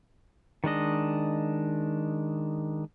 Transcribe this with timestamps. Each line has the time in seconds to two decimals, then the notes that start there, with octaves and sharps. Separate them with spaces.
0.64 D#3 G#3 D4 D#5